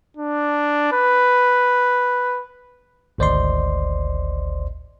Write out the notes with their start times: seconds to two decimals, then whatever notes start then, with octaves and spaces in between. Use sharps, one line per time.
0.17 D4
0.93 B4
3.18 G#1 D2 C5 D5 D#5 C6